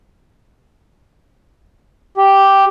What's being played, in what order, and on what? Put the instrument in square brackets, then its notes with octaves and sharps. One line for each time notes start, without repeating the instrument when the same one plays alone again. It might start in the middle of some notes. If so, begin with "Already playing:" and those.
[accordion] G4